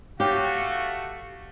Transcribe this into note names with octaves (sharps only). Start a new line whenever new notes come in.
A3 F#4 G4 C#5 F5 G5